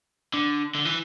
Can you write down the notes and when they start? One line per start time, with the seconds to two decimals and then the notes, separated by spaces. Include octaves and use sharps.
0.34 D3
0.75 D3
0.85 E3